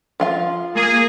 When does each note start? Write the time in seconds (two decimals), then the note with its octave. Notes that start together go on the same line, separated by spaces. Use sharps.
0.20 F3 F4 F5
0.75 A#3 G#4